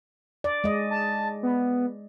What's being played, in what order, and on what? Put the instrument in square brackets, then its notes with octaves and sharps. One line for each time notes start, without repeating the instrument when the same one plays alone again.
[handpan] D5
G#3 D#5
[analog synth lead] A5
B3